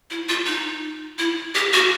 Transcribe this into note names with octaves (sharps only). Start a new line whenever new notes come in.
E4
F4
D#4
E4
G4
F#4